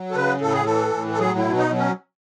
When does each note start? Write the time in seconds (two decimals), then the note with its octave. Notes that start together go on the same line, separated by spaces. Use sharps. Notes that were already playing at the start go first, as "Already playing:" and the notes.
Already playing: F#3
0.11 A4
0.15 C#3 B4
0.41 A2 A4
0.53 G#4
0.65 E3 A4
0.94 A2
1.13 A4
1.19 F#3 G#4
1.38 E4
1.45 B2
1.58 D#4
1.71 F#3
1.78 C#4